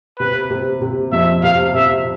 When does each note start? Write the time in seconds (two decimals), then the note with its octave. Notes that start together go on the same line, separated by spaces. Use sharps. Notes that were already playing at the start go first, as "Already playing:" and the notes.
0.19 C3 B4
0.50 C3
0.81 C3
1.12 F2 E5
1.43 C3 F5
1.74 C3 E5